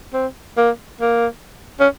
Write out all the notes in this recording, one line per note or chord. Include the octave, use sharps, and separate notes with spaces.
C4
A#3
A#3
C#4